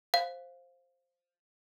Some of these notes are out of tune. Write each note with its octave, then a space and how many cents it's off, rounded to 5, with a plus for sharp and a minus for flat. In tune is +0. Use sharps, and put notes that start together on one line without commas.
C5 +5 F5 +0